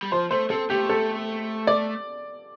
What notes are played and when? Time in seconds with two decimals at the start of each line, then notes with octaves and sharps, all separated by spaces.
0.03 G3
0.11 F3 C5
0.31 A3 C5
0.50 C4 A4
0.70 A3 G4
0.89 A4
1.67 D5